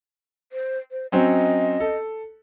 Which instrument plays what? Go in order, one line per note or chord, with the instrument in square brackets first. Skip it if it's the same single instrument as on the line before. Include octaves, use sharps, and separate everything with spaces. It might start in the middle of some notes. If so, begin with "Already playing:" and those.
[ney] C5
C5
[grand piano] F#3 C4 C#4 [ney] D#5
[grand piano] A4